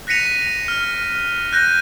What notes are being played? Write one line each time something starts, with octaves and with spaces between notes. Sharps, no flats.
F#6 A#6 B6 C#7 D#7 F7
F6
F#6 G6 A#6 D#7